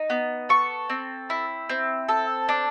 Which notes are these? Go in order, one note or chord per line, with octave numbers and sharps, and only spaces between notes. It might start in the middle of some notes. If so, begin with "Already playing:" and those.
Already playing: D#4
B3
A4 C#6
C4
E4
C4
A4
D4